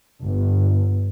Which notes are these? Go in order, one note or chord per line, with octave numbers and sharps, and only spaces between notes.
G1